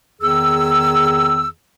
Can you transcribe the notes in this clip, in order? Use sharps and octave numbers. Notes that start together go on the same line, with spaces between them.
E2 D#3 G#4 E6